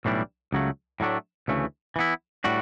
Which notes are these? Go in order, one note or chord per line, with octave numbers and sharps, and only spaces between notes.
B1 A2 E3 G3 D4
C#2 C#3 F#3 A3
A2 F#3 A3 D4
D2 C#3 E3 A3
E3 B3 E4
A2 G3 D4 F#4